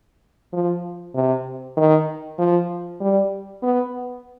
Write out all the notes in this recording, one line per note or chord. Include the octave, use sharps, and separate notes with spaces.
F3
C3
D#3
F3
G3
B3